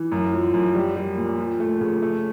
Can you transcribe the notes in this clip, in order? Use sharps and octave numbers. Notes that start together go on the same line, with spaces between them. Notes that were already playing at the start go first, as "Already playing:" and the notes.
Already playing: E3
F#2
F3
F#2
G3
G3
A#2
F3
A3
C#3
A3